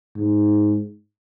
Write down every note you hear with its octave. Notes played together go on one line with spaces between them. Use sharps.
G#2